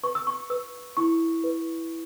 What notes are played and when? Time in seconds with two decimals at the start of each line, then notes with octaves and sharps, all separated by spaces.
0.03 B4 C#6
0.15 E6
0.27 C#6
0.50 B4 E6
0.97 E4 C#6
1.44 B4